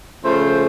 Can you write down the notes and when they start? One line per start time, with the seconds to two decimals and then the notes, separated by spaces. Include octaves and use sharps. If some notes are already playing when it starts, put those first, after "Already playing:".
0.23 C#3 F3 A3 C5